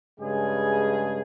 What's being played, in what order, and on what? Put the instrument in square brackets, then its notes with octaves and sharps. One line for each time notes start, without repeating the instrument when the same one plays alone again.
[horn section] G2 C#3 G#3 G#4